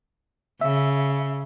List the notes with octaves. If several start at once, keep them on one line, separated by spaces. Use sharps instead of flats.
C#3 E5